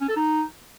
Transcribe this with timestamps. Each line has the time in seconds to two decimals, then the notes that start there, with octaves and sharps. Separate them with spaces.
0.01 C#4
0.09 A4
0.16 D#4